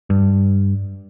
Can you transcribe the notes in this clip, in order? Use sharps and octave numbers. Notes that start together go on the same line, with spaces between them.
G2